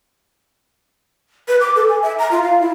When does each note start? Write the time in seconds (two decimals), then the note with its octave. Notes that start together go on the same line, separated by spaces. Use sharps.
1.48 B4
1.60 D6
1.76 A4
1.89 G#5
2.02 E5
2.19 A#5
2.31 F4
2.43 F5
2.60 E4